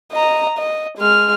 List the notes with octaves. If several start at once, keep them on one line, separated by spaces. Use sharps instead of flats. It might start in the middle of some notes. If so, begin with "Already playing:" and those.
D#5 A#5
D#5
G#3 F6